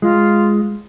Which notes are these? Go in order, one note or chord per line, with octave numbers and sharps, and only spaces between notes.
G#3 F4